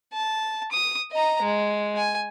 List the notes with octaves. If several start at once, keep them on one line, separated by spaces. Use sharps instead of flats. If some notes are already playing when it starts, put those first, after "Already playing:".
A5
D#6
D#5 A#5
G#3
G#5